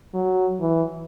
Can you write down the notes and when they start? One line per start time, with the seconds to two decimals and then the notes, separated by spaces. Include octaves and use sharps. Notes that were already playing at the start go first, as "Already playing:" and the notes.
0.14 F#3
0.61 E3